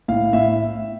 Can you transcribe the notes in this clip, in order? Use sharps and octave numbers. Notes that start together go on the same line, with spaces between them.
A2 F5
A2 E5